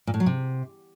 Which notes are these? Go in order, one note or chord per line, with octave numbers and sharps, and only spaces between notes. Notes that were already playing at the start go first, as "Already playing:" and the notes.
A#2
A2
F#3
C3